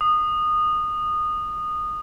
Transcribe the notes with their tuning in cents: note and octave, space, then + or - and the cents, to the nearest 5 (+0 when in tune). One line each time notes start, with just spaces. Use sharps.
D#6 -20